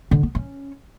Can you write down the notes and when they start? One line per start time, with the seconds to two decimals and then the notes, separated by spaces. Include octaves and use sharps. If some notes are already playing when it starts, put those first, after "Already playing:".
0.11 D3
0.23 B3
0.35 C#4